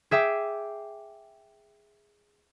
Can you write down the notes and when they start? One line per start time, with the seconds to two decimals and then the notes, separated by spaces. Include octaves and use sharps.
0.11 G#4 E5 G5 D6